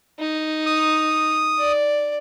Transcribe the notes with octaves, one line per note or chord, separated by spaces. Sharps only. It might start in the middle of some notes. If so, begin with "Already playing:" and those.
D#4
D#6
D5